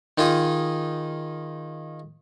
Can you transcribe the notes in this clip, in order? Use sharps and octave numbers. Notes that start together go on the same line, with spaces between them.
D#3 D#4 F4 G#4 D#6